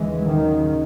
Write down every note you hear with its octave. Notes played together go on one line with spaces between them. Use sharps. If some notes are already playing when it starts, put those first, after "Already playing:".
Already playing: D#2 C#3 E3 G#3
D#3 F#3